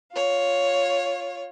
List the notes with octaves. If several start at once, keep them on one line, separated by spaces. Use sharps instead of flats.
F4 C#5